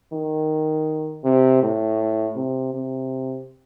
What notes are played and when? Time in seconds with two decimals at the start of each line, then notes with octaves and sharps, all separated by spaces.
0.12 D#3
1.24 C3
1.62 A2
2.36 C3
2.74 C3